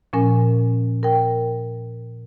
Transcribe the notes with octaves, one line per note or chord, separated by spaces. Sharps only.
A#2 F3 C#4 A#4 G#5
A#4 G5